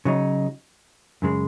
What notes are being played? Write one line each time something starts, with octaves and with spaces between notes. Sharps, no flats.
C#3 F#3 D#4
F#2 C#3 G#3